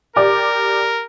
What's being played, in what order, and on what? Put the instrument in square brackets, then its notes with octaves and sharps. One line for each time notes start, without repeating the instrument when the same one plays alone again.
[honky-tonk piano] G4 D5 D6 [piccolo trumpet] A#4